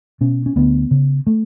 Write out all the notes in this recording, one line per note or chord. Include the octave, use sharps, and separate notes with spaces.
B2 C#4
C#4
D2 B3
C#3
A3